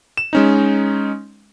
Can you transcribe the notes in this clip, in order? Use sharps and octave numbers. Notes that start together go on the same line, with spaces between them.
E7
G#3 C#4 D#4